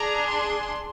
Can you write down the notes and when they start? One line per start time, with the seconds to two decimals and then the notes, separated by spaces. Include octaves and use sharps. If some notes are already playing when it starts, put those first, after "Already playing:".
Already playing: D4 G#4 A#5
0.28 C6